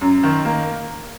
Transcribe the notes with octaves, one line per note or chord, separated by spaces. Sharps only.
F#2
D#3
A#3